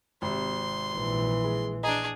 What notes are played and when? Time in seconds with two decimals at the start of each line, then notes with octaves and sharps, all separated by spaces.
0.22 G#1 C3 C6
0.95 A#1 E3
1.44 G#3
1.83 D4 G#4 D#5 A#5